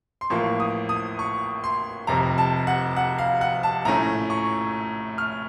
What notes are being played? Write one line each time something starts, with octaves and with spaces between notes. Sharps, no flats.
C6
A1 A2 F3 A#3 C#6
D#6
D#6
C#6
C6
F1 F2 C3 A#5
A5
F#5
F#5
F5
F#5
A5
A#1 A2 A3 C#4 A#5
C#6
F6